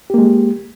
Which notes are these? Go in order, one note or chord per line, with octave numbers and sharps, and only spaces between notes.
G#3 A#3 G4